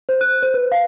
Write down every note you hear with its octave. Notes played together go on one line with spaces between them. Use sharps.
C5
F#6
C5
B4
F5